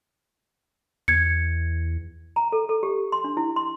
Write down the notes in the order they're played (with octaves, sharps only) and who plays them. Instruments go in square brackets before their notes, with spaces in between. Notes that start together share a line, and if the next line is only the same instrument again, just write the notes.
[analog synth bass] E2 [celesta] G#6 C#7
[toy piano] A#5
A4
A4
G4
C6
D4
E4
C6